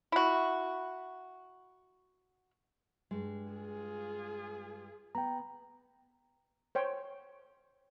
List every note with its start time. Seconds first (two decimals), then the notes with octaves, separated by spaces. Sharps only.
0.12 E4 F#4
3.11 G2 G#3
3.48 F4 G#4
5.15 B3 G5 A#5
6.75 C5 C#5 G5